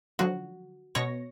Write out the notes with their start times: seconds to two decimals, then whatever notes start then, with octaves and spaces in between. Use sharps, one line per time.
0.19 D3 F3 F#3 F#4
0.95 B2 C#5 C#6 A#6